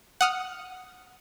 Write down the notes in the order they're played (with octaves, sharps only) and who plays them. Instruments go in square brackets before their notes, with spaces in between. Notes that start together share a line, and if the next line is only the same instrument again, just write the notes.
[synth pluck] F#5 D#6 F6